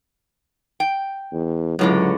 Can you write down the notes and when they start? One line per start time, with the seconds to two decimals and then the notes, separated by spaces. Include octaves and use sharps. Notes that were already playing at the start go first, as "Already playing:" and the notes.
0.80 G5
1.33 E2
1.79 C#2 F#2 A2 D3 F#3